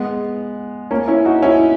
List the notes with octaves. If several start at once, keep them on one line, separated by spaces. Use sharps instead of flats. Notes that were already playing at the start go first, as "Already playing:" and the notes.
Already playing: G#3 B3
A#3 C#4
C#4 E4
D#4 F#4
C#4 E4